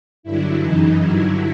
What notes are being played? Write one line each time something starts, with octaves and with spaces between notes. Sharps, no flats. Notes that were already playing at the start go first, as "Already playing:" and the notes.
G2 D3 F#3 E4
F#2 C#3 E3 D#4
G2 D3 F#3 E4